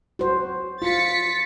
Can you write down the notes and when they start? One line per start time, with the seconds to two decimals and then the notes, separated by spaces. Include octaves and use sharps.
0.19 F#4 C5
0.82 F4 A6 B6 C#7